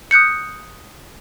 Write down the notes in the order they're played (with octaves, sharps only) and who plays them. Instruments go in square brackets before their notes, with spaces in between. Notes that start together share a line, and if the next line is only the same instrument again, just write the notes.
[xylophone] D#6 F#6 G6 C#7